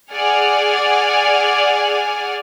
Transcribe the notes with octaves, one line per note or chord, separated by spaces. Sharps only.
G#4 D5 F#5 G#5 F6